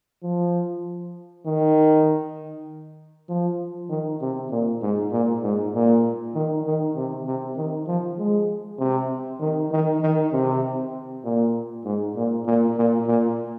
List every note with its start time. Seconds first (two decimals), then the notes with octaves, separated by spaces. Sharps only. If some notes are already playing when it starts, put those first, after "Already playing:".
0.23 F3
1.46 D#3
3.29 F3
3.90 D#3
4.21 C3
4.51 A#2
4.82 G#2
5.12 A#2
5.43 G#2
5.74 A#2
6.35 D#3
6.66 D#3
6.96 C3
7.26 C3
7.57 D#3
7.88 F3
8.19 G#3
8.79 C3
9.40 D#3
9.71 D#3
10.02 D#3
10.33 C3
11.24 A#2
11.85 G#2
12.16 A#2
12.46 A#2
12.77 A#2
13.07 A#2